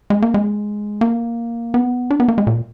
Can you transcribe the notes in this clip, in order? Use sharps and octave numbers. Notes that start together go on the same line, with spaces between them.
G#3
A#3
G#3
A#3
B3
D4
B3
A#3
G#3
A#2